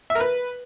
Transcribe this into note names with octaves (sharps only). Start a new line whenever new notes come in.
E5
A#4
B4